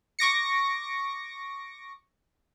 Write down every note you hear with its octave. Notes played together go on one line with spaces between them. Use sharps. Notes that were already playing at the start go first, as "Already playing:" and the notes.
C#6 D6 A#6 C#7